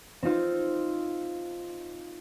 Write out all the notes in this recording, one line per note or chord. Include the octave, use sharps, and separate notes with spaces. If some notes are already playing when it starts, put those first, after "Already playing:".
C4 D#4 F4 C5